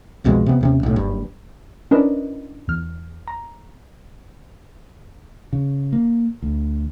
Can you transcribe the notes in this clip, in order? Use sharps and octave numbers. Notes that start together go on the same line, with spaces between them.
C2 F2 B2 G#3
C3 B3
D#2 C3 C#4
B1 A2
F#1 G2
C#4 D4 E4 A#4 B4 D#5
E2 F6
A#5
C#3
A#3
D2